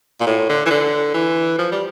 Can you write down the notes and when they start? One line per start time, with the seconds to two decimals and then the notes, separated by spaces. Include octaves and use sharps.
0.20 A#2
0.27 A2
0.49 D3
0.66 E3
0.70 D3
1.14 E3
1.59 F3
1.72 G3